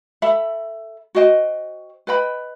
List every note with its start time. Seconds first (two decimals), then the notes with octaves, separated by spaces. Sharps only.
0.22 A4 E5 B5
1.15 F#4 C5 D#5 G5
2.07 B4 D#5 G5 B5